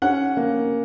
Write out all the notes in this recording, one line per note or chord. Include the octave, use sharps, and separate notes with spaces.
C#4 F#5
A#3